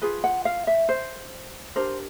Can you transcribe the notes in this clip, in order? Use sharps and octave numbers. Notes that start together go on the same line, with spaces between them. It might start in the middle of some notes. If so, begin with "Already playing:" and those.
F4 G#4 B4
F#5
F5
E5
C5
D4 G4 A#4 C5